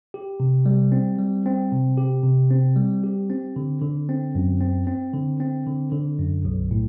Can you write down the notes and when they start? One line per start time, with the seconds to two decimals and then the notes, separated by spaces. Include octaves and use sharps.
0.14 G4
0.40 C3
0.66 G3
0.92 C4
1.19 G3
1.46 C4
1.72 C3
1.98 G4
2.23 C3
2.51 C4
2.76 G3
3.04 G4
3.30 C4
3.56 D3
3.82 D3
4.09 C4
4.35 F#2
4.60 C4
4.87 C4
5.14 D3
5.40 C4
5.66 D3
5.92 D3
6.18 F#2
6.45 B1
6.71 A2